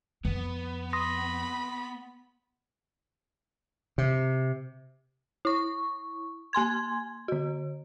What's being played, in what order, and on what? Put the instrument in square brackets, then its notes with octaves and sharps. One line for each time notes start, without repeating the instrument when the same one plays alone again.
[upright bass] F2 [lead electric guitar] B3
[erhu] B5 [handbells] C6 D#6 A#6
[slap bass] C3
[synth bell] E4 C#6
A#3 G#5 C6 G#6
D3 F#4